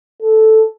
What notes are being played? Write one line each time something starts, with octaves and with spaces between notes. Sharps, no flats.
A4